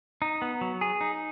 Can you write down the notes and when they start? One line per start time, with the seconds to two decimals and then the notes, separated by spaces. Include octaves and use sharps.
0.22 D#4
0.42 B3
0.61 F#3
0.81 G#4
1.01 D#4